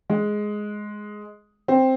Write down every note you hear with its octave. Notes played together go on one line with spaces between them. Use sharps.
G#3
C4